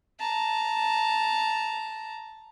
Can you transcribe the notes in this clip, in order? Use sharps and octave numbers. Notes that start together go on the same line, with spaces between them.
A5 A#5